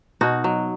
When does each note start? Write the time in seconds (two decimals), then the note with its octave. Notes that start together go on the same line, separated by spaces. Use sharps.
0.21 B2 D#4 F#4
0.44 F#3